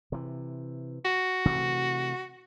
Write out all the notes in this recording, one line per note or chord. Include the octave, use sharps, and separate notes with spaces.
C3 E3
F#4
C3 E3 A3